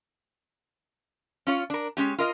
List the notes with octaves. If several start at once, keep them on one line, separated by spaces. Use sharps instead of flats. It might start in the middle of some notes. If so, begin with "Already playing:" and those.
C#4 F4 C#5
D4 A#4
G#3 C#4 G4
F4 A#4 D#5